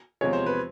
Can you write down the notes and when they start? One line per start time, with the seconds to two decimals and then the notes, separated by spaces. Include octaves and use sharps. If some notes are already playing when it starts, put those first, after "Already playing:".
0.21 E2 C3 F3 G#3 C#5
0.33 C5
0.46 B4